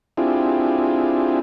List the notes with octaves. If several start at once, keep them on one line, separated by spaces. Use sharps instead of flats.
C4 D4 E4 F4 G4 G#4